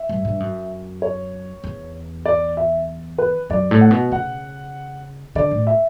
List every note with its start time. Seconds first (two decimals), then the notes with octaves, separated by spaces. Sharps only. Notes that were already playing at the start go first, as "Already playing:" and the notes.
Already playing: E5
0.09 G2
0.25 G2
0.40 F#2
1.02 C#5
1.64 E2
2.26 D5
2.57 E5
3.18 B4
3.50 F#2 D5
3.71 A2
3.81 F#5
3.91 B2
4.12 C#3 F#5
5.35 D3 D5
5.51 A2
5.67 E5